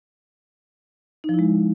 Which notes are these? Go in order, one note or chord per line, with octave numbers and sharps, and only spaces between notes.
F3 G#3 D#4 E4